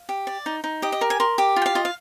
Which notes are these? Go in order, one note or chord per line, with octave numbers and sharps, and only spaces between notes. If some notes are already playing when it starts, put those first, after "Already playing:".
Already playing: F5
G4
D5
D#4
D#4
G4 D#5
D#5
A#4
G#5
A#4 C6
G4 D6
F4
G5
F5
F4 D#5
F5